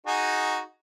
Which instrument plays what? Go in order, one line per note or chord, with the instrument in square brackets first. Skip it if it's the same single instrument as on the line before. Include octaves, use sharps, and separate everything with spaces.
[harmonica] D#4 F#4 G#4